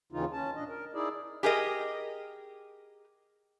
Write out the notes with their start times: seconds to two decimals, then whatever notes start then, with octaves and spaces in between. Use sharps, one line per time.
0.12 D#2 C#3 E3 D#4 F4
0.33 C#4 A5
0.56 A#2 D4 D#5
0.68 A#4
0.94 D#4 E4 G#4 D5
1.43 G4 G#4 A#4 D#5